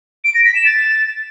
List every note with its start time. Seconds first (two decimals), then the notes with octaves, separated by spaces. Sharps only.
0.24 D7
0.34 A#6
0.45 B6
0.55 E7
0.65 A6